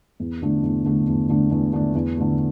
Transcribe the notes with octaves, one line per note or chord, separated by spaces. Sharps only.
E2
D3 A3 D4
E2
D3 A3 D4
E2
D3 A3 D4
E2
D3 A3 D4
E2
D3 A3